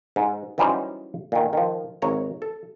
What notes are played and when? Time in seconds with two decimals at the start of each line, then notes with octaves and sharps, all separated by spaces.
0.16 G#2
0.58 E3 F#3 G3 C#4 D#4 C5
1.32 A#2 D#3
1.53 D#3 F3
2.02 G#1 C#5 A#5
2.42 A4